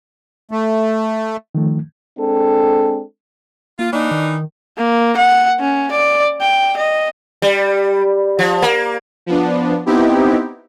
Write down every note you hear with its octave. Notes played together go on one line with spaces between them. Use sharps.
A3
D#3 F3 A3
G#3 C4 D4 A4
A#3 F4
E3 A#3 D4 D#4
D#3
A#3
F#5
C#4
D5
G5
D#5
G3
F3
A#3
F3 B3 D4
B3 C4 D#4 E4 G4